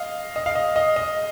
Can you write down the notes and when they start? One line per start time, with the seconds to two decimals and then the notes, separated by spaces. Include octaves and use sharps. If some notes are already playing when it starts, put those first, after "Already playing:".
Already playing: D#5 F5
0.36 D#5
0.46 F5
0.55 D#5
0.76 D#5
0.96 D#5